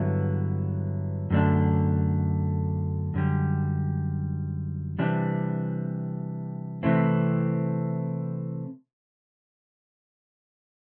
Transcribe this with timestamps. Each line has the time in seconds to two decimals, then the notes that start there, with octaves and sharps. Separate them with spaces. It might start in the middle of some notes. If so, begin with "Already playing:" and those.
Already playing: G2 D3 F#3 B3 E4
1.30 F#2 D3 A3 D4
3.14 F#2 D3 G3
4.99 C3 E3 G3 D4
6.83 C3 E3 A3 C4 E4